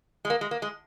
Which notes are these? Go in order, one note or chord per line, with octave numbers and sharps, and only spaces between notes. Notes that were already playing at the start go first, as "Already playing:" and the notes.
G#3
A#3
G#3
A#3
G#3